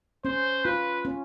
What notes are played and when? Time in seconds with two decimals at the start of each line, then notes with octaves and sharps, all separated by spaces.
0.25 C#4 C5
0.65 F4 B4
1.05 C#4